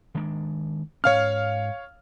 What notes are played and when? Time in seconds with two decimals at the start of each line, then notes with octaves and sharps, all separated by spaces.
0.15 D#3 G#3 D4
1.04 G#2 C#4 C#5 F5 F6